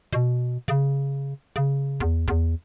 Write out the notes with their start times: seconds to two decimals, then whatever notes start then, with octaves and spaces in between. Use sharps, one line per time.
0.13 B2
0.68 C#3
1.56 C#3
2.00 E2
2.28 E2